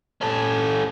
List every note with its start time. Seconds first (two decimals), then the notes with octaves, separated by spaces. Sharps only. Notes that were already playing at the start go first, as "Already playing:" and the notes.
0.21 C#4 A4